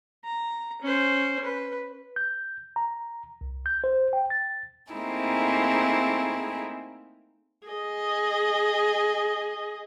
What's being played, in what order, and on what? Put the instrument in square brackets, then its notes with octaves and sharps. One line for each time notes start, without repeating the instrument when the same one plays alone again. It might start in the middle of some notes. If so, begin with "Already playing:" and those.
[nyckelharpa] A#5
C#4 C5
B4
[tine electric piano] G6
A#5
C2
G6
C5
G5
A6
[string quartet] A3 A#3 C4 D#4 E4 G#4
[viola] G#4 D#5